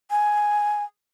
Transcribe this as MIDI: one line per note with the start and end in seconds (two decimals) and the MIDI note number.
0.10 0.84 80